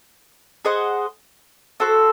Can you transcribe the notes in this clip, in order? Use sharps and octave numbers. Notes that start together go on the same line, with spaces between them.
G#4 C5 D#5 F#5
F#4 A4 C5